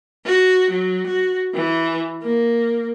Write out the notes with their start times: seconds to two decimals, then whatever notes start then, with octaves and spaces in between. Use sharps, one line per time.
0.25 F#4
0.70 F#3
1.07 F#4
1.54 E3
2.23 A#3